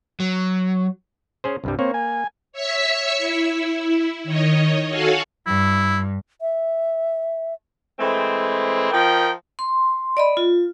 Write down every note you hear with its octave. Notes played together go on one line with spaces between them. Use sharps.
F#3
C#4 G#4 C5
C2 G2 G3
A#3 C4 C#5
G#5
C#5 E5 C#6 E6 B6 C#7
E4
D#3 C#5 D#5
F#4 A4 C#5 F5 F#5 G#5
G2 E4
E5
E3 G#3 A3 C4
F3 A#4 D#5 G5
C6
D5 D#5 B5
F4